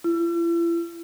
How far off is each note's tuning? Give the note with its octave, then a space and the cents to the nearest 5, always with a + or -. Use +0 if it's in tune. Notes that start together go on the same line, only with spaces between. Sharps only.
E4 +45